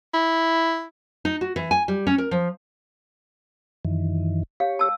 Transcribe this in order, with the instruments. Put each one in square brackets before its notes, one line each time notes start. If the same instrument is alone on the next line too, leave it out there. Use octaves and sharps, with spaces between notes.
[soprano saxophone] E4
[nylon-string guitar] D#4
F#4
E3
G#5
G3
C#4
A#4
F3
[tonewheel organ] F#2 D#3 E3
[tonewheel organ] G4 C#5 [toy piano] F5
[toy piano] A5 E6